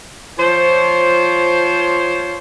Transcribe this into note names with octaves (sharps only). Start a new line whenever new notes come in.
F3 C5 C#5